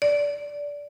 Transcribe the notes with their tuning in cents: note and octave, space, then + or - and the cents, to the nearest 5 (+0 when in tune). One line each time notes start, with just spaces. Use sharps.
D5 -15